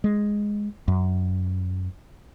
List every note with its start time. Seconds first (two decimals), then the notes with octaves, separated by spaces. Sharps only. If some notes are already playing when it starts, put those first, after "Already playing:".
0.04 G#3
0.88 F#2